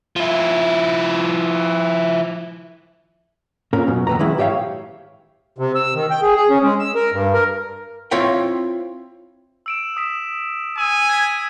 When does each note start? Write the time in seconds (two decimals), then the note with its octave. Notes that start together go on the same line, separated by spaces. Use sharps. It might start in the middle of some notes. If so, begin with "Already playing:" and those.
0.16 F3 E4
3.73 A#2 C#4 A#4
3.87 F#2 B2
4.07 D#2 B3 A#5
4.19 D#3 E3 F#3 G#3 E4
4.38 G#2 G4 C#5 E5 F5 G5
5.58 C3
5.75 E6
5.94 D#3
6.11 G5
6.22 G#4
6.36 G#4
6.50 C#4
6.63 G#3
6.79 E6
6.95 A#4
7.13 G2
7.33 A#4
8.11 C4 E4 F4 C#5 E5 G5
9.66 E6 D7 E7
9.97 D#6 B6 E7
10.78 G#5 D#6 E6
11.09 G#6 B6